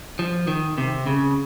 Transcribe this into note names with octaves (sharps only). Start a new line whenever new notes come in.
F3
D#3
C3
C#3